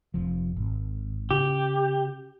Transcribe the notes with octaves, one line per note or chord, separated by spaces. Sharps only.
F1 F3
G#1
C#3 G4